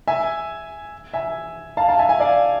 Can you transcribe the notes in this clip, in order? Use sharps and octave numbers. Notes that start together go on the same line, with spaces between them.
E5 G#5
E5 G#5
F5 A5
F5 A5
E5 G#5
E5 G#5
D5 F5